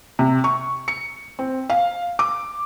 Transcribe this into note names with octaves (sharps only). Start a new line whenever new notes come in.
C3
C#6
C#7
C4
F5
D6